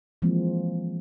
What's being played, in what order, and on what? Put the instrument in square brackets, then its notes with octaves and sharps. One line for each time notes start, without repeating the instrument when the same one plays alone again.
[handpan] E3 F3 G#3 A#3 C4